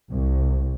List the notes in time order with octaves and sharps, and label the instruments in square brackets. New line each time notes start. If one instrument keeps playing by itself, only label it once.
[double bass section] C2